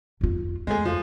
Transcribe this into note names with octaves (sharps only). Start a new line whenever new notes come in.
F2 F4
F2 G#3 A3 G#4
F3